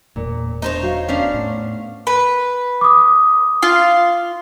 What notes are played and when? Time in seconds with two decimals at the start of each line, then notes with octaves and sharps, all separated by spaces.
0.16 E1 A#2
0.62 B3 D4 D#4 C5 C#5 E5
0.83 F#4 F5
1.08 B3 C#4 D4 F5
1.34 A2
2.07 B4
2.81 D6 D#6
3.63 F4